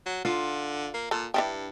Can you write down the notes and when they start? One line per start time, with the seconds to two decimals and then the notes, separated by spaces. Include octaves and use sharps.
0.06 F#3
0.25 D3 F4
0.94 A#3
1.11 A#2 A4
1.34 G2 D4 E4 G4